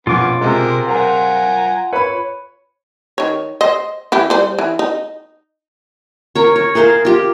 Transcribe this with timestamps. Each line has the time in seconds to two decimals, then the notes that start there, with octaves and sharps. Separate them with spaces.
0.07 A#1 B2 B3 C#4 F4 D6
0.41 C3 G#3 A#4 C5
0.88 A#4 C5 F#5 G#5 A#5
1.93 B4 C#5 B5
3.18 D#3 C#5
3.61 C5 D#5
4.12 E3 E4 G4
4.30 G3 C5
4.59 E3
4.79 D#4
6.35 A#4 C#5
6.56 C#5
6.75 G#4 A#4 C5 F5
7.05 F4 G4